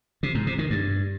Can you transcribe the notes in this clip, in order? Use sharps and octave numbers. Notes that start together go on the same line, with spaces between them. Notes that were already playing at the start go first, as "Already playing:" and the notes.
C3
G#2
C3
D#3
G2